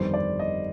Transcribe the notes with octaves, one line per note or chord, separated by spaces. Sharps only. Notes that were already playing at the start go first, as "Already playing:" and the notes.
Already playing: G1 F2 D#3 G3 C5
D5
D#5